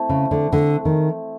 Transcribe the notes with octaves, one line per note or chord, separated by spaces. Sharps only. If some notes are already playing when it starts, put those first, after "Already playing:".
Already playing: A3 C4 E4
C#3
D3
D3
D#3